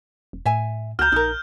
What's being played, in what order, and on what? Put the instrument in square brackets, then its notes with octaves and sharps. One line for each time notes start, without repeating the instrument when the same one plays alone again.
[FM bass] E1
[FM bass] A2 [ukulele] E5 G#5
[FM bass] C#2 [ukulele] F#4 A#5 [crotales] F6 G6
[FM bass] A#1 [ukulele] D#4 A#4